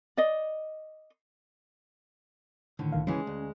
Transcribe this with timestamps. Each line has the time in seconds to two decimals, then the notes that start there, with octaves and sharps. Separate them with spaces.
0.17 D5 D#5
2.79 A2 D3 D#3
2.92 C2 D#3 F5
3.07 C#3 E3 G#3 C#4 G#5
3.27 D2